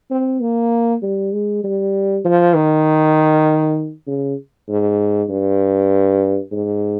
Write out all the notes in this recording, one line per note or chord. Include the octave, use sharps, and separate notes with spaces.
C4
A#3
G3
G#3
G3
F3
D#3
C#3
G#2
G2
G#2